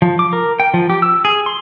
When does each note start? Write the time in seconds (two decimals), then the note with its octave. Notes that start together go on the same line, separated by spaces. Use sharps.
0.02 F3
0.19 D6
0.33 A#4
0.60 G5
0.74 F3
0.90 G4
1.02 E6
1.25 G#4
1.46 C6